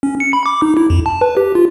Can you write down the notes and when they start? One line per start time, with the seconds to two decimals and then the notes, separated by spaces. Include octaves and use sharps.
0.03 C#4
0.20 C#7
0.33 B5
0.46 D6
0.62 D#4
0.77 E4
0.90 F2
1.06 A5
1.21 B4
1.37 G4
1.55 F4